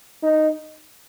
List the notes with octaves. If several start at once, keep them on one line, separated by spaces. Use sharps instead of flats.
D#4